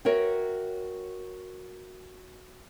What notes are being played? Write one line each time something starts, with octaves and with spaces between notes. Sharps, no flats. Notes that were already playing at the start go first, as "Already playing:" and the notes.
F#4 A#4 C#5 E5 G5